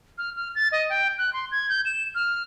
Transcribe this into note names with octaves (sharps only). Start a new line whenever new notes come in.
F6
F6
A6
D#5
G5
F#6
C6
G#6
G6
E7
F6